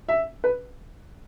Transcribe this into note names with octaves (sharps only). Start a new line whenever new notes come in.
E5
B4